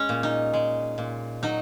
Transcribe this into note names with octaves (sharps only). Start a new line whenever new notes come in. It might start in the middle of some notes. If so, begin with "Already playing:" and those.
Already playing: G#3 C#4
A#2
D#4
G#3
A#2
F#3 D#4